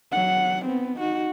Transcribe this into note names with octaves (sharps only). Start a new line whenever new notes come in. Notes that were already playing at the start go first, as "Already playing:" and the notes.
F#3 F#5
B3 C4
D#4 F#4